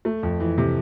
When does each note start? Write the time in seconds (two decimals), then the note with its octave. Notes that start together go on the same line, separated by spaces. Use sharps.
0.05 A3
0.23 F2
0.40 E3
0.58 C3